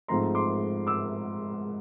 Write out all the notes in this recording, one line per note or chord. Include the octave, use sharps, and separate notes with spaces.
G#2 F3 A3 C4 A#5 C6
C6 D6
D6 E6